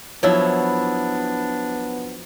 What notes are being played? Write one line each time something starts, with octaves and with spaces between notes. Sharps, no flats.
F3 F#3 B3 D4 E4 C#5